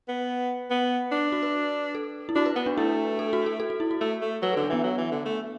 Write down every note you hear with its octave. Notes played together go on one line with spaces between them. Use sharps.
B3
B3
D4
F#4
B4
A4
E4
D4 F#4
B4
B3 B4
D4
A3 E4
A4
F#4
A4
A4
F#4
E4
F#4
A3 A4
A3
F#3 B4
D3 A4
D4
E3 B3
F#3
E3
D3
A3